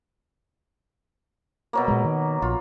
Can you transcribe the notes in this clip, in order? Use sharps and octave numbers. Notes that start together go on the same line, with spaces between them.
B2 F#3 A#3
A#2 G#3
D#3
A#1 F4